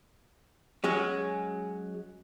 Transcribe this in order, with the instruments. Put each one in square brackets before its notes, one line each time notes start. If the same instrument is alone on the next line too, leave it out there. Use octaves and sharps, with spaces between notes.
[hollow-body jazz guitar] F#3 G#3 C#4